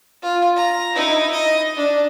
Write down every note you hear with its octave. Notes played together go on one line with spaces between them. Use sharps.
F4
A#5
D#4 E4
D#5
D4